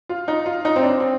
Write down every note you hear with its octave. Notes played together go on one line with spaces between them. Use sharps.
F4
D#4
F4
D#4
C4
D4
C4
C4